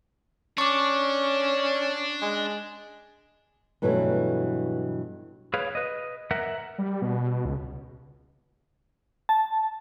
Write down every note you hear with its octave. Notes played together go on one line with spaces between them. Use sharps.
C#4 D4 C#6 D6
G#3
G2 B2 E3 F#3 G3 A3
G#4 B4 C#5 F5
B4 D#5
A#4 E5 F#5
G3
B2
C#2
A5